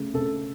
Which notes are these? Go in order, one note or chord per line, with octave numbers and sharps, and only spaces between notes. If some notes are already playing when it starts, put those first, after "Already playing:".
Already playing: C#3 A3
C#3 A4